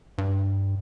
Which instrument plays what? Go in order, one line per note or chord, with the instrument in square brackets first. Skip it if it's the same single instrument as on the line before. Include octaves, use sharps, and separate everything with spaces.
[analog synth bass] G2